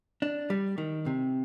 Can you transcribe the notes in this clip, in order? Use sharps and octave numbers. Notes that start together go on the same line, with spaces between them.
D4
G3
D#3
C3